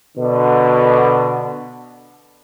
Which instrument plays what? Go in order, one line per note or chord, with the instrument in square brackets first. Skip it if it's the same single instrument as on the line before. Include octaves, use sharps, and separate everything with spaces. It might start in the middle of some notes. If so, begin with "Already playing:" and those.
[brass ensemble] B2 D3